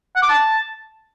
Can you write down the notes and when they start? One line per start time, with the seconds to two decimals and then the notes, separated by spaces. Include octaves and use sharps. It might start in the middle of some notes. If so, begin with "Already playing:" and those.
0.15 F#5
0.22 D6
0.29 A5